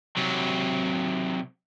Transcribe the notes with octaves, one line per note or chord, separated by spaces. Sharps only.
C3 F#3